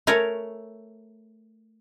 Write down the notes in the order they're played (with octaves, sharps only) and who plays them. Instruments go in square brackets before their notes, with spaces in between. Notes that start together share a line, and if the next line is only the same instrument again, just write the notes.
[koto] A3 A#4 C#5 G#5